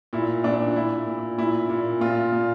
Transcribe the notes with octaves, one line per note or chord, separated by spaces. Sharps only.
A#2 E4
A#2 D4
A#2 E4
A#2
A#2 E4
A#2
A#2 F4
A#2